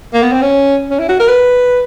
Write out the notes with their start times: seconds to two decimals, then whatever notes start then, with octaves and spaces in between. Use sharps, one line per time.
0.14 A#3
0.23 B3
0.32 C4
0.42 C#4
0.90 C#4
0.99 E4
1.09 F#4
1.20 A#4
1.28 B4